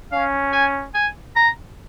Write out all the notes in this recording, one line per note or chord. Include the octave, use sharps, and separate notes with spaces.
C#4 F5
G#5
G#5
A#5